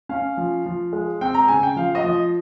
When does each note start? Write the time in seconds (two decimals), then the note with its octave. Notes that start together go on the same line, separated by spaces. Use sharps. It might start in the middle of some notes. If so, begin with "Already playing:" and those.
0.09 C#4 F5
0.37 F3
0.66 F3
0.93 G#3
1.21 C4 G5
1.34 A#5
1.48 C#3 G#5
1.63 G5
1.76 F3 F5
1.95 D#5
2.04 F3